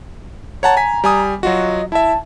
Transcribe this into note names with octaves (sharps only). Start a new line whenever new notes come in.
C#5 F#5 A5 A#5
G#5 B6
G3 G#5 D#6
F#3 F4 F#4 D#5
E4 E5 A5